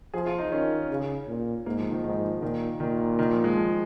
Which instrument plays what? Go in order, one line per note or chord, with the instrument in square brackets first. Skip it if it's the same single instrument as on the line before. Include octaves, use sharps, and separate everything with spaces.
[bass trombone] F3 [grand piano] G#4
[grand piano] F4
D#4
[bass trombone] D#3 [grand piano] C#4
[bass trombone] C#3
A#2
[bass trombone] G#2 [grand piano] A#3
[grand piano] F3
D#3
[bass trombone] G#2 [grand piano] D#3
[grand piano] F3
[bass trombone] A#2 [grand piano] D#3
[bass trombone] A#2 [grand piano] D#3
[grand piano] D#3
F3
G#3
F3